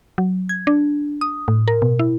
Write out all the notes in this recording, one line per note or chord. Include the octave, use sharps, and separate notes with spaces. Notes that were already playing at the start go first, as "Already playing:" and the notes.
F#3
G#6
D4
D#6
A2
A#4
B2
E4